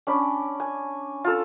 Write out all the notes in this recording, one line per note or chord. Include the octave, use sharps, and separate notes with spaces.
C#4 D4 B5
G#5
F4 A4